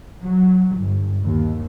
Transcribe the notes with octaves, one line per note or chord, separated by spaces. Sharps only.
F#3
G1
D#2